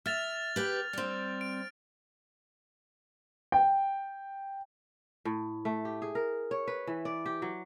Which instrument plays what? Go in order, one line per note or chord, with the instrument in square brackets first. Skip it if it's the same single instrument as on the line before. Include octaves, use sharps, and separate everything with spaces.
[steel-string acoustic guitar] E5 [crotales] F6 A6 F7
[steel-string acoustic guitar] G4 B4
G3 C4
[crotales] D7
[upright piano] G5
[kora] A2
A3
G4
G#4
A#4
C#5
B4
E3
D5
G4
F#3